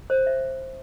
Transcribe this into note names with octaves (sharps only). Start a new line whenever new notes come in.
C5
E5